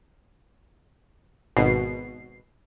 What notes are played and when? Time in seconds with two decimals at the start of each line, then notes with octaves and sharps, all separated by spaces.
1.57 G#1 B2 C7